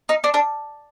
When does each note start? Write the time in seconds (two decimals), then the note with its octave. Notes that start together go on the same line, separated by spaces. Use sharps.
0.09 D#4
0.24 D4
0.34 D4